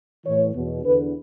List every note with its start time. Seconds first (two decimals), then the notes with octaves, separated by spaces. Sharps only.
0.25 A2 E3 C#5
0.54 E2 B2
0.84 E2 D3 B4